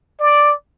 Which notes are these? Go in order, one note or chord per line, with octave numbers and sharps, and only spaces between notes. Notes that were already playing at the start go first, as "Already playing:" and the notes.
D5